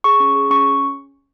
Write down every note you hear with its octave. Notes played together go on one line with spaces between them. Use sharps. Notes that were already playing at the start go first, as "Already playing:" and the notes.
G#4 C#6
C#4
G#4
C#4 C#6